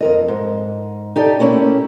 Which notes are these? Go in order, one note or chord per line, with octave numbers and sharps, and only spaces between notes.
F2 A#4 D#5
G#2
D#4 G4 A4 D5
A3 A#3 C#4 E4 G4